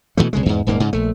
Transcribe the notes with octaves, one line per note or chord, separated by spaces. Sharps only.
B2 D#3 E3 A3
B1 C#3 G#3
E2 G#2
D#1 G#2 A#3
G#2 C#3
A#1 A3